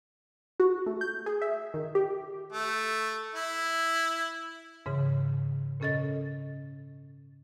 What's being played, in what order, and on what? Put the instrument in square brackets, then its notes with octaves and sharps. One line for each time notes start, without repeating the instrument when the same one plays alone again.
[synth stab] F#4
A3
G6
G#4
E5
D#3
G4
[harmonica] A3
E4
[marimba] G#2 C#3 E3
A#2 C#3 C#4 A4 D#5 A6